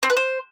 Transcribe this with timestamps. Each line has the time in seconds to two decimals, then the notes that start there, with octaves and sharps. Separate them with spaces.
0.03 C4
0.10 B4
0.17 C5